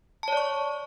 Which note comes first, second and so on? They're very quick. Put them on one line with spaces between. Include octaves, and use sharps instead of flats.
A5 C#5 D5 C#6